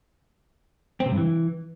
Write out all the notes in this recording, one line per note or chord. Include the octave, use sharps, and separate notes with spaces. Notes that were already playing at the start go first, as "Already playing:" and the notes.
C4
C3
G2
E3